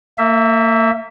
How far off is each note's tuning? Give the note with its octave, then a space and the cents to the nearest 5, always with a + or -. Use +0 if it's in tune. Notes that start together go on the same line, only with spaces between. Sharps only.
A#3 -35 E5 +0